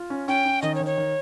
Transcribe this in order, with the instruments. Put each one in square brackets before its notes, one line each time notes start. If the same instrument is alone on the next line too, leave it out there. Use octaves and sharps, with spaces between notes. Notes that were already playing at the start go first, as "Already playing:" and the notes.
Already playing: [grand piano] F4
C#4
[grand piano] C#4 [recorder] G5
[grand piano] C#4
[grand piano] D#3 [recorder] D#5
[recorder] C#5
[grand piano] D#3
[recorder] C#5
[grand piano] D#3